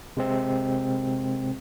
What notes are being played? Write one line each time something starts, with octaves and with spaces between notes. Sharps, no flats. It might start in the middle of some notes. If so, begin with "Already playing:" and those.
C3 G#3 C4